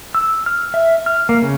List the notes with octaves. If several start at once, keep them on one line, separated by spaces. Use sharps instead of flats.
E6
F6
E5
F6
A#3
C#3